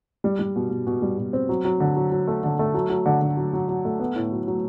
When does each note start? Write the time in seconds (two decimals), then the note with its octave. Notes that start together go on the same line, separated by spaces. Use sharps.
0.24 G3
0.39 G3
0.56 B2
0.70 B2
0.87 B2
1.02 G3
1.18 B2
1.33 C4
1.49 F#3
1.65 F#3
1.80 D3
1.96 F#3
2.11 F#3
2.28 A3
2.43 D3
2.59 A3
2.74 F#3
2.90 F#3
3.06 D3
3.21 D3
3.37 F#3
3.53 F#3
3.69 F#3
3.85 A3
4.00 B3
4.16 A2
4.32 F#3
4.48 F#3